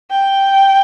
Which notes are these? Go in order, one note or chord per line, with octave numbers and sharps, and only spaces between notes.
G5